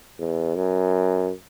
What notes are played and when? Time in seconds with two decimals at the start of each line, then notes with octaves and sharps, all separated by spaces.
0.19 E2
0.55 F#2